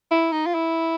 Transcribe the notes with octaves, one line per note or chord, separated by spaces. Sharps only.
E4
D#4
F4
E4